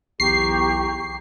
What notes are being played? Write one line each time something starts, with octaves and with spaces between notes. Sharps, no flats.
B1 E2 G4 A#5 C#6 C7